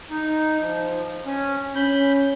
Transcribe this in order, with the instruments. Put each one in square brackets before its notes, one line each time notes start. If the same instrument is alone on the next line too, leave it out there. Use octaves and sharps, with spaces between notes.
[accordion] D#4
F3
C#4
[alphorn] C#4 [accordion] B5 G6